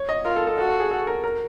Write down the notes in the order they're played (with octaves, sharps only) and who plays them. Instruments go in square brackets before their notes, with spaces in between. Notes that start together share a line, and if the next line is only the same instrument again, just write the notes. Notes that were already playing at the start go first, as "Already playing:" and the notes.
Already playing: [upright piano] C#5
D#5
[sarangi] F4 [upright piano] A#4
[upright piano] A4
A4
[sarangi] F#4 [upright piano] A4
[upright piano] A4
G#4
A4
A#4
A#4